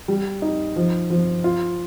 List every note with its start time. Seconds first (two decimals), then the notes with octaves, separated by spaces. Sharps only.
0.08 G3
0.42 D#4
0.76 F3
1.10 F3
1.44 F4